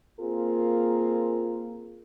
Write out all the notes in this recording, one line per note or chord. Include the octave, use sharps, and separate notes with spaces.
A#3 C4 F4 G#4 A#4